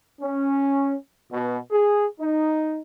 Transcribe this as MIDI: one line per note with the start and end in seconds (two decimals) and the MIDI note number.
0.21 0.94 61
1.32 1.58 47
1.71 2.06 68
2.20 2.80 63